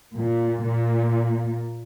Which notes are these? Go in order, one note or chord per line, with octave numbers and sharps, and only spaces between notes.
A#2
A#2